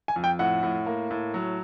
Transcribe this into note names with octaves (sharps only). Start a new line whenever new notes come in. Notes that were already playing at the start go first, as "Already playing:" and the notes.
G#5
F2
G5
A2 F#5
A2
A#3
A2
F#3